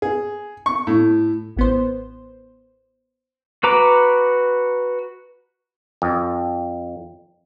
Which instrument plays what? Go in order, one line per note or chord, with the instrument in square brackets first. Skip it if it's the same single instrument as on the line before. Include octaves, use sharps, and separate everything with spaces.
[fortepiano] G#4
C#6
A2
[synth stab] A1 B3 C5
[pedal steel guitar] F#4 B4 A#5 D6
[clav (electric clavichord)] F2